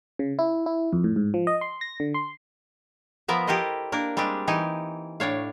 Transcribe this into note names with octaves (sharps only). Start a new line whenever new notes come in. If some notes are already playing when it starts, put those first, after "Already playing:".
C#3
E4
E4
F2
A2
G#2
F3
D#5
C6
A#6
D3
C6
F3 B3 A#4 E5
E4 G4 A4 A#4 C5 D#5
A#3 D4 A#4
G3 G#3 C4 D4 G4
E3 D#4 G4 G#5
A2 D4 C#5 F5